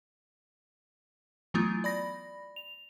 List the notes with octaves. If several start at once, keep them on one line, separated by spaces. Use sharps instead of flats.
E3 F#3 A3 B3 E4 F4
D5 B5 A#6
F7